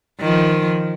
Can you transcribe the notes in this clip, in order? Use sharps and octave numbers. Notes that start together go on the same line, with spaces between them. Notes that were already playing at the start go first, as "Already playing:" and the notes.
D#3 F3